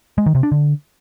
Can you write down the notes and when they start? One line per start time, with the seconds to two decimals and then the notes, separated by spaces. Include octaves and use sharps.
0.18 G#3
0.26 D#3
0.35 C3
0.43 D4
0.52 D3